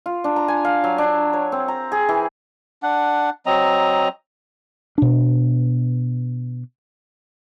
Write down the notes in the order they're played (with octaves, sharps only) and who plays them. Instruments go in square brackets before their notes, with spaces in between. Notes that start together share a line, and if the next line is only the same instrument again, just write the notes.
[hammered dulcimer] F4
D4
A#5
G#5
F5
F#3
D4
C#5
C4
A#5
G#4
E3
[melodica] D4 F#5
F#3 C4 D#5 A#5
[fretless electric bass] B2 D4